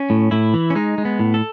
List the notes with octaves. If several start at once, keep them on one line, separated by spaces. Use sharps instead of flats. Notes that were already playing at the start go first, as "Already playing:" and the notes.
Already playing: C#4
A2
A2 E4
E3
C#4
G#3 D#4
G#3
B3
A2
A4